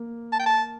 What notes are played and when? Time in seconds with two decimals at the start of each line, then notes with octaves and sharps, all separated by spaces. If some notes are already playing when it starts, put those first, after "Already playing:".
Already playing: A#3
0.33 A5
0.39 G5
0.46 A5